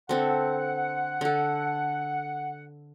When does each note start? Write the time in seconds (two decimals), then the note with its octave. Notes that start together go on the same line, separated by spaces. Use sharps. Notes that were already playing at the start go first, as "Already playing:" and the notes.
0.09 D3 C4 A4 F#5
1.21 D3 A4